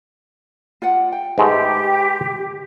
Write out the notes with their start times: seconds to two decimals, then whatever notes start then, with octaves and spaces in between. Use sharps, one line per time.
0.82 F4 D5 F#5
1.12 G5
1.38 G#2 G#3 A3 G4 B4